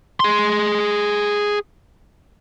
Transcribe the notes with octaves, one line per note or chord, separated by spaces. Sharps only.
G#4 C6